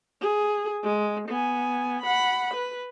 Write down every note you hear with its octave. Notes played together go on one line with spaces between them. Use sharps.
G#4
G#3
B3 G#5
F#5 B5
B4